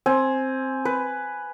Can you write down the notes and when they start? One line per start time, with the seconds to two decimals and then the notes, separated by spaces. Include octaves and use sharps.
0.06 C4 G#5
0.85 B4